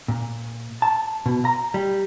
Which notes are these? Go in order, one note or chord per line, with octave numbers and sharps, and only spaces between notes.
A#2
A5
B2
A#5
G3